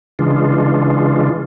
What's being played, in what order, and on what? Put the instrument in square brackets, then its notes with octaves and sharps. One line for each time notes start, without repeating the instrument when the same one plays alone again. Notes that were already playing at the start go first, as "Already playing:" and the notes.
[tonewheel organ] C#3 E3 G#3 D4 F4